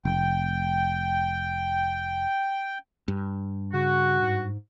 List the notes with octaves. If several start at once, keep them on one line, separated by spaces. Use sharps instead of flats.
F1 G5
G2
C#3 F#4
G#2